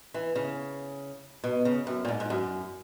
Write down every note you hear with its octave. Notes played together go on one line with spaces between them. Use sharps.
E3
C#3
B2
C#3
F#2
A#2
G#2
G#2
F#2